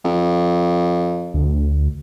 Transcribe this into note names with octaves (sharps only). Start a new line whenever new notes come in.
F2
D2